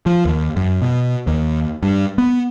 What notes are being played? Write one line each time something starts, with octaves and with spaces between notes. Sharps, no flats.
F3
D#2
F#2
B2
D#2
G2
B3